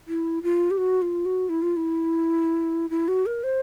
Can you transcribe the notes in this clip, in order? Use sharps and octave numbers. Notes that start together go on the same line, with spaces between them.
E4
F4
G4
F#4
F4
F#4
E4
F4
E4
E4
F#4
A#4
C5